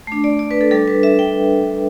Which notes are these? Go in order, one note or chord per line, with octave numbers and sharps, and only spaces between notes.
A3 D4
D5
D5
B4
A4
G3 D4 A4
B4
E5
G5